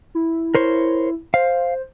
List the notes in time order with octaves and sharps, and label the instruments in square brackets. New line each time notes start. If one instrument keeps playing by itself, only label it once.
[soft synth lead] E4
[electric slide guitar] A#4 C5 C#5
[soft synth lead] C5 [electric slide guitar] F5